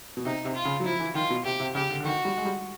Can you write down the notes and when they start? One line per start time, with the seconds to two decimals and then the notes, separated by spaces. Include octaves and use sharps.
0.17 B2
0.25 C3 D#4
0.45 C3
0.55 F4
0.65 C#3
0.80 F#3
0.85 F3 E4
1.00 E3
1.15 D#3 F4
1.30 B2
1.45 C3 G4
1.60 C3
1.75 C#3 G4
1.90 D3
2.00 D3
2.04 D#3 F#4
2.25 G3
2.37 G#3
2.45 G3